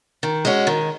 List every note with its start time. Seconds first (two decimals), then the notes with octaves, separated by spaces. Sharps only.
0.23 D#3
0.45 G#3 C#4 F#4
0.67 D#3